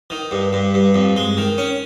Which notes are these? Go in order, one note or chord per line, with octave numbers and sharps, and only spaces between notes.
D#3
G2
G2
G2
F2
G#3
D#3
C#4